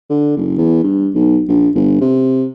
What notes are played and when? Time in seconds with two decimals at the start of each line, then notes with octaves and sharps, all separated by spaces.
0.10 D3
0.37 F#1
0.58 E2
0.83 G2
1.14 B1
1.48 A#1
1.75 G1
2.01 C3